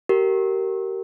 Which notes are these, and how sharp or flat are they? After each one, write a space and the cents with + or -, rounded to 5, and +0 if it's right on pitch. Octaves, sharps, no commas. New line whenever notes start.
G4 -30 A#4 -15